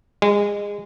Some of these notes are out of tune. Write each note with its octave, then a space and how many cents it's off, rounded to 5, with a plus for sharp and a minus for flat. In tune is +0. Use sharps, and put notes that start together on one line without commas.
G#3 -25